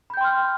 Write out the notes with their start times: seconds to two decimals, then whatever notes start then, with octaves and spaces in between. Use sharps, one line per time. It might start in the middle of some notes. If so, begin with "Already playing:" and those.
0.10 B5
0.14 G6
0.17 G5
0.21 C6
0.24 F6